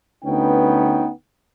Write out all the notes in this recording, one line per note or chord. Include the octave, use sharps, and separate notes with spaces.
D2 B3 C#4 D#4 B4 G5